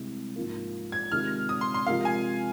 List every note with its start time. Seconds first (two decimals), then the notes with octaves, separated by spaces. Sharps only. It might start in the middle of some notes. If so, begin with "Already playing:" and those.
Already playing: C2 C3 G#3
0.35 G#2 F3 A#3
0.92 G#6
1.12 C3 D#3 G#3 F4 F6
1.49 D#6
1.61 C6
1.74 C6
1.87 C3 F3 G#3 F4 A#4 F5
2.05 G#5